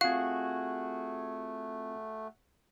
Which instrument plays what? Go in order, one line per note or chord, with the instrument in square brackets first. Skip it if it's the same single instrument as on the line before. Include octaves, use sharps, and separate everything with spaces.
[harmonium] A3 [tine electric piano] C4 F4 [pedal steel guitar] F#4 G#4 [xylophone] F5